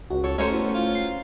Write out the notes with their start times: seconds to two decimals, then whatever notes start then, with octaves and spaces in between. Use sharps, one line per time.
0.10 C#2 F#4
0.24 A4 C#5
0.38 A3 C#4 A#4 C5 C#5
0.52 B3 E4
0.74 F4
0.95 C7